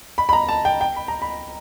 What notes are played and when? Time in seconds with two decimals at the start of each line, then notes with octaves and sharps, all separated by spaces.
0.18 B5
0.29 B5
0.33 A#5
0.49 A5
0.65 G5
0.81 G5
0.96 B5
1.08 A#5
1.22 B5